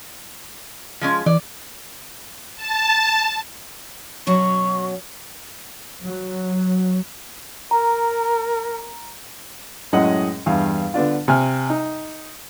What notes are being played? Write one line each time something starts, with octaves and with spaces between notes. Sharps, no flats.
F3 G#3 C#4
E3 D5
A5
B2 F#3 C#4 C#6
F#3
A#4 A#5
F#2 A2 G#3 C#4 D#5 F#5
E2 G2 F5
D3 B3 D4 F4
C3 G#5 F6
D#4